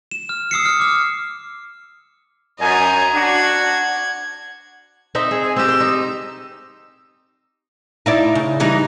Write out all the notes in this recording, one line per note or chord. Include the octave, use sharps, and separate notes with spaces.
E7
F6
D#6 E6 C7 C#7
F6
D6 F6
F#2 D#5 G#5 A#5
D4 F#4 F#5 G#6
C4 D#4 E5
G#4
G#5
C4 G4 E6
C5
D#4
D#4 E4 D5
C#3
E3 G3 D#4